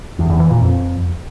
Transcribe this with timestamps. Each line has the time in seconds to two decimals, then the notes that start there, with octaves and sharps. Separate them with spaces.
0.19 E2
0.29 E2
0.40 E3
0.50 A#2
0.61 F2